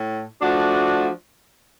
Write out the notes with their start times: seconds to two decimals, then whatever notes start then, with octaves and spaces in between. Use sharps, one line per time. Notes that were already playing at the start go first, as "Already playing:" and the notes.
Already playing: A2
0.41 F3 A3 D4 F#4